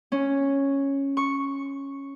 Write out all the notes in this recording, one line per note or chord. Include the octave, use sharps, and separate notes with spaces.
C#4
C#6